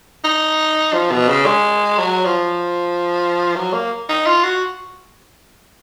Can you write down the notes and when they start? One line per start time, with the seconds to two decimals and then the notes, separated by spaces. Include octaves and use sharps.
0.24 D#4
0.93 F3
1.11 B2
1.29 C#3
1.46 G#3
1.99 F#3
2.25 F3
3.56 F#3
3.73 A#3
4.09 D#4
4.26 F4
4.44 F#4